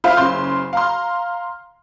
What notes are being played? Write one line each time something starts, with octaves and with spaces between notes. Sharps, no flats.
F4 C5 E5 F5
F#1 C#3 C6
F5 A#5 C6